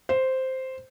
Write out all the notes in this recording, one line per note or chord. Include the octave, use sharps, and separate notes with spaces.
C5